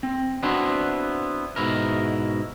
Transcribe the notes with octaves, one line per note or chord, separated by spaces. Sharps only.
C4
B3 C4 D4 E4 F#4 C5
G#2 B2 E4 A#4